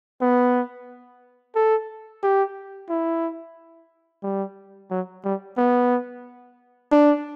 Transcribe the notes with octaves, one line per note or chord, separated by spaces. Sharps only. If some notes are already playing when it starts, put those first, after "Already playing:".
B3
A4
G4
E4
G3
F#3
G3
B3
D4